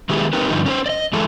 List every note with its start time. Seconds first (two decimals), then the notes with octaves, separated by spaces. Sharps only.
0.09 D#3 G#3 B3 E4 G4 G#4
0.33 C4 D#4 G4 A#4 B4
0.50 G2 D3 F3 D#4
0.66 C#4 A#4 C5
0.86 D5 D#5
1.13 E3 G#3 E4 A4